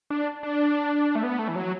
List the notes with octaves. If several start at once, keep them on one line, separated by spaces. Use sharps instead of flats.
D4
D4
A3
B3
A3
E3
F#3